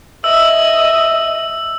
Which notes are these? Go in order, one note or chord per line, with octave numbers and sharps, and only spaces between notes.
D#5 E5 E6